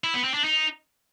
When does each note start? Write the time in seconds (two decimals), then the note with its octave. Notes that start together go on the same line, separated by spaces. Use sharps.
0.04 E4
0.14 B3
0.24 C4
0.34 D4
0.44 D#4